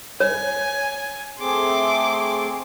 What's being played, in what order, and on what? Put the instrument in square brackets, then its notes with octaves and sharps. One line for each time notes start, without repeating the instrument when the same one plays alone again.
[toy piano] C#5 [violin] G#5
[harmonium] A3 C4 G#4 [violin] C6 D6